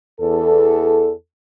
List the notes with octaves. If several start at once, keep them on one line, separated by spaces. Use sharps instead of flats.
E2 A4